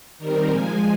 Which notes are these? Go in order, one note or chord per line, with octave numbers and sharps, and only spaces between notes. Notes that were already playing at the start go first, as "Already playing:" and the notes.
D#3 G3 C4 A#4
A#2 F3 G#3 G#5